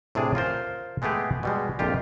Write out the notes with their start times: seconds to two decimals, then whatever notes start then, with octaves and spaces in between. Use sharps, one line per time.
0.15 A2 C3 D4 G#4
0.35 F4 A#4 C5
1.02 G#3 A3 B3 G4 G#4
1.43 B2 G3 G#3
1.79 A#1 F2 F4 G4